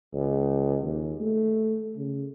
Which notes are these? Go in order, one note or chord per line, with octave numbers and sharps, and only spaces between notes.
C#2
D#2
A3
C#3